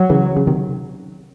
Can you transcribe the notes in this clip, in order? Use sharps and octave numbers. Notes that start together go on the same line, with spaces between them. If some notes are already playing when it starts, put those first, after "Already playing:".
Already playing: F#3
C#3 E3
C#3
C3 D#3